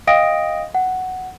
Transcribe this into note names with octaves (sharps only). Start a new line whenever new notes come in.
D#5 F5 G5 D#6 A#6 D7
F#5